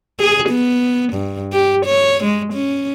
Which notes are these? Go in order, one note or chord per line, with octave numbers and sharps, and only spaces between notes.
G#4
B3
G2
G4
C#5
G#3
C#4